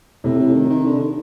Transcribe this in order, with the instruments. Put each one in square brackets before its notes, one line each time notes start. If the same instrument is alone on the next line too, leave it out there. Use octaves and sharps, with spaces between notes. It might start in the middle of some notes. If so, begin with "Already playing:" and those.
[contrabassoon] A2 [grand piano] C3
[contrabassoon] A2
D#3
D#3
D3
D#3